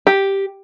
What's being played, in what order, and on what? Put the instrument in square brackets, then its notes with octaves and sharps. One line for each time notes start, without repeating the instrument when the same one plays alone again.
[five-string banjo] G4